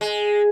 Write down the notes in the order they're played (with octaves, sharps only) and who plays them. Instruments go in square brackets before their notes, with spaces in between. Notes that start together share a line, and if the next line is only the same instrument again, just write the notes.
[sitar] G#3